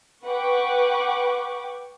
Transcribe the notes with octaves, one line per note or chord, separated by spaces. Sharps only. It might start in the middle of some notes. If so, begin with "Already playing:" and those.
B4 F#5 G5 C#6 D6